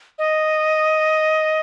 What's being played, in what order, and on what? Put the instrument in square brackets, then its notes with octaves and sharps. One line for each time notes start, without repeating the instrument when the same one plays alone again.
[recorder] D#5